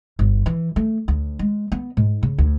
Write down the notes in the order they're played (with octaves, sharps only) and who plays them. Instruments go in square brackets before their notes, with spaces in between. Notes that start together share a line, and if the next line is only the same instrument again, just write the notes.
[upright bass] G1
E3
A3
D2
G#3
B3
G#2
C#3
D2